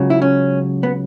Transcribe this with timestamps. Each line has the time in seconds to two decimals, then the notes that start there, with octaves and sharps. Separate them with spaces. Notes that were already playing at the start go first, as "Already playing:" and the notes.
Already playing: C#2 C#3 F#3
0.10 E4
0.22 C#4
0.83 B3